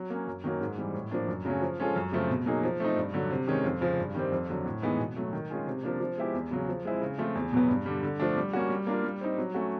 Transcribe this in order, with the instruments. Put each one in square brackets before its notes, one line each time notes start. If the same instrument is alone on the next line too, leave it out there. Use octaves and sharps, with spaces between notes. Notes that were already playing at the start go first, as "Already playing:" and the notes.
Already playing: [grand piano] F#3
A#3 C#4
F#2
D#3 F#3 A#3 C#4
G#2
E3 G3 C4
A2
F3 A#3 D4
F#2
C#3 F#3 A3 C#4
F3
G#3 C#4 F4 A4
F#2
C#3 F3 A3 C4
B2
F#3 A#3 D#4 G#4
F3
A3 C4 D#4
G2
D3 F#3
C3
D#3 G#3 C#4
F2
C#3 F3
G2
D#3 G3 C4
F2
D3 F#3
A2
E3 G#3 B3 D#4
B2
F#3 A3
D#3
G#3 C#4 F4 G#4
C3
F3 A#3 D4
F3
G#3 B3 E4 G4
E2
C#3 F#3
F3
G#3 C4 E4
C#3
F3 A3 C4 F4
E2
B2 F#3 B3
G2
D3 G3
D3
F3 A3 D4
G3
A#3 C#4 F#4
G3
A#3 D4 F4 A#4
G3
C4 D#4
F#3
A3 C#4 F#4